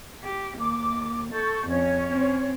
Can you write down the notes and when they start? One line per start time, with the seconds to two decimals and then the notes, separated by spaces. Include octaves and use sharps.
0.24 G4
0.58 D#2 D6
1.32 A4 C#6 G6
1.68 F2 C#4 C#5
2.11 C4